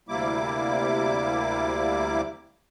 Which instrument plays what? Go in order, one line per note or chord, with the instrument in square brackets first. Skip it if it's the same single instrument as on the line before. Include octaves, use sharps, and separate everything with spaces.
[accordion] D2 C3 G3 A#3 E4 D6